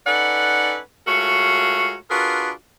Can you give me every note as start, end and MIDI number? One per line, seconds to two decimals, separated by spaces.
0.07 0.79 61
0.07 0.79 63
0.07 0.79 69
0.07 0.79 71
0.07 0.79 74
0.07 0.79 78
1.07 1.96 56
1.07 1.96 57
1.07 1.96 65
1.07 1.96 66
1.07 1.96 70
1.07 1.96 73
2.11 2.51 62
2.11 2.51 65
2.11 2.51 66
2.11 2.51 68
2.11 2.51 70
2.11 2.51 71